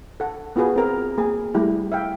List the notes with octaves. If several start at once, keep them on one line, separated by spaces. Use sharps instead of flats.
A4 F#5
B3 F4 F#4 G#4 B4
C4 G#4 A#4
A#3 G#4
G3 A3 E4 G4
E5 F5 G5